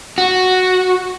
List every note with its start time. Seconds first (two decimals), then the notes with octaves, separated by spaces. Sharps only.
0.18 F#4